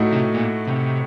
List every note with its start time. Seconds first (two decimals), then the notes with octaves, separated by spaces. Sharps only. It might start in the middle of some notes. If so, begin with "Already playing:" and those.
Already playing: A2 A3 D#4 F#4
0.13 C3
0.34 A#2
0.67 C3